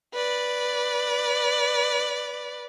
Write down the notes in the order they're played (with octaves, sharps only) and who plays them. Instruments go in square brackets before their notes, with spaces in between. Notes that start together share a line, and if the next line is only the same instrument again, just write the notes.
[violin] B4 D5